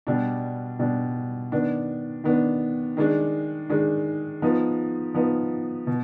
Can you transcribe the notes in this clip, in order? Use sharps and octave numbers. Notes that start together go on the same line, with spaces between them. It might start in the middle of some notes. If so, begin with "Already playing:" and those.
B2 G3 D4
B2 G3 D4
D#3 B3 D4
D#3 B3 D4
D#3 G#3 D4
D#3 G#3 D4
F3 B3 D#4
F3 B3 D#4
B2